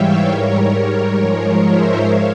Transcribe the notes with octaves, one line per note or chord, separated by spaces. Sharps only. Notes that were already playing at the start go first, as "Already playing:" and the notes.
Already playing: G#2 E3 G3 C#5 E5 F5 G5
G#2 G3 A#4 C#5
A#4 C#5
G#2 F3 G#3
C5 E5
C#5 F5